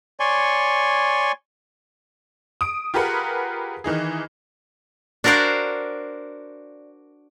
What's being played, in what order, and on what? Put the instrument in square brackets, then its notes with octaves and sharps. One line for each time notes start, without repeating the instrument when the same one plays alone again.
[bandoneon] C#5 D5 G#5 C6 C#6
[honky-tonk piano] D#6 D7
F4 G4 G#4 A#4 B4 F#5
D#3 E3 D#4 G#4
[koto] D4 F#4 A#4 C5 D5 F5